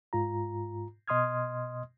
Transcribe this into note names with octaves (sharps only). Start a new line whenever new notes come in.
G#2 F4 A#5
B2 D#5 C6 D#6 F6 G#6